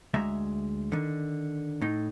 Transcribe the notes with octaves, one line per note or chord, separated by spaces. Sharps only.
D2 G#3 E5 A#5
D3 D#3
A2 D#4